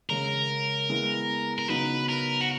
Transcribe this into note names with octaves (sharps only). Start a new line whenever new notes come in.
C#3 G#3 C#4 A#4
G#3 B3 E4
A#4
C#3 F#3 B3 D#4 B4
A#4
F#4